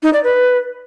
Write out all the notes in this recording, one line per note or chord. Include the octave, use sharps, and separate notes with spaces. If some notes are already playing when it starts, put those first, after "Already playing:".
D#4
D5
B4